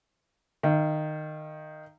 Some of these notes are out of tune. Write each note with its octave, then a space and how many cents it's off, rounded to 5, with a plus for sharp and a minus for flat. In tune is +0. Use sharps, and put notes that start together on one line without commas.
D#3 -15 F5 -40